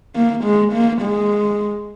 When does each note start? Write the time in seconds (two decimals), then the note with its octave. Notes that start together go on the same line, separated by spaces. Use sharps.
0.16 A#3
0.44 G#3
0.72 A#3
1.01 G#3